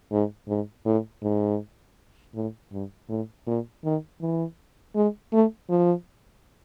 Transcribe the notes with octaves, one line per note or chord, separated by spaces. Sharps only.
G#2
G#2
A2
G#2
A2
G2
A2
A#2
D#3
E3
G#3
A3
F3